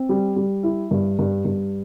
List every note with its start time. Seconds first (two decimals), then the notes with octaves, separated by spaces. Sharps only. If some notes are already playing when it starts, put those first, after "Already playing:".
Already playing: C4
0.09 G3
0.36 G3
0.63 E4
0.91 G2
1.19 G2
1.45 G2